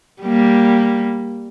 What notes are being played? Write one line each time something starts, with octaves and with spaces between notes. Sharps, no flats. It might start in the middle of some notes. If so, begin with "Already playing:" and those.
G3 A#3